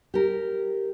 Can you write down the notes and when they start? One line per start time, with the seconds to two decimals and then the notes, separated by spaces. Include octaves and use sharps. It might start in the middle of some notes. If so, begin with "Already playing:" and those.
0.14 G4 A#4